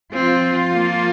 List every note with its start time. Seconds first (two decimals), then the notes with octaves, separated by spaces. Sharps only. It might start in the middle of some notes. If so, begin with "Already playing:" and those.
0.14 F3 C4 F4
0.73 A#3